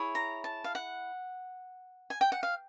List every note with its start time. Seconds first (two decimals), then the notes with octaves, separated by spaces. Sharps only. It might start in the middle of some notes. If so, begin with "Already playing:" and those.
Already playing: E4 G#4 C#5
0.15 A#5
0.44 A5
0.64 F5
0.75 F#5
2.10 G#5
2.21 G5
2.32 F#5
2.43 F5